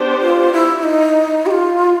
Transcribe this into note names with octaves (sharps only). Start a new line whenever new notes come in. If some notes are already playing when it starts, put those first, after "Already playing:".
Already playing: B3 D4 G4 C5
F4
E4
D#4
G4
F4